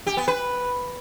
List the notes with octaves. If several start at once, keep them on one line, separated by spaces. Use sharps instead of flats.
G4
B3
B4